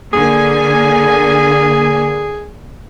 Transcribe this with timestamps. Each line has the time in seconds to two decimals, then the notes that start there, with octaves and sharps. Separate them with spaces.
0.13 D3 A#3 G#4 G#5